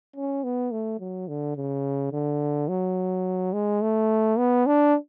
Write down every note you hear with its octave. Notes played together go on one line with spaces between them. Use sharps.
C#4
B3
A3
F#3
D3
C#3
D3
F#3
G#3
A3
B3
D4